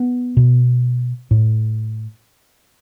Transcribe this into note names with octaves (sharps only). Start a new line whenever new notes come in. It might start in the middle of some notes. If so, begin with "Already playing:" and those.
Already playing: B3
B2
A2